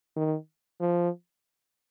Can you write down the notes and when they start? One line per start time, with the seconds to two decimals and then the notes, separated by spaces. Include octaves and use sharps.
0.16 D#3
0.80 F3